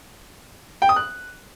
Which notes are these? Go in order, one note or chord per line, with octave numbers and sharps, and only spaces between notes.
G5
D#6
F#6